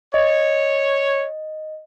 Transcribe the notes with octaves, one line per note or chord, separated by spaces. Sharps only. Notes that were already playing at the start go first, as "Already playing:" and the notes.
C#5 D#5